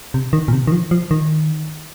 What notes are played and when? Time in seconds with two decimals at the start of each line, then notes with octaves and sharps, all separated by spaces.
0.14 C3
0.33 D#3
0.48 A#2
0.53 C3
0.67 D#3
0.72 F3
0.91 F3
1.11 D#3